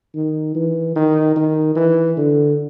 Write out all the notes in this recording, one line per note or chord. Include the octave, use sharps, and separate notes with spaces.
D#3
E3
D#3
D#3
E3
D3